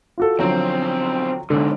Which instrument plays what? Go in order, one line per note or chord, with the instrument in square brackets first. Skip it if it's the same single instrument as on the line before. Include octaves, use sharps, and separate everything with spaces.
[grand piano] F4 F#4 A4
[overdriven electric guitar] B1 C4 [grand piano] D3 F3 F#3
[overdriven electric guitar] B1 G#2 [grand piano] D3